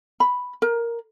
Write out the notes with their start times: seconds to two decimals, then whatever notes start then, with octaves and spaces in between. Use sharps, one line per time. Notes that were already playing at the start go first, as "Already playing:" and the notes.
0.20 B5
0.62 A#4